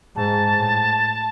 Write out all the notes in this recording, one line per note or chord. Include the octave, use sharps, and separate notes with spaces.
G#2 A5
A2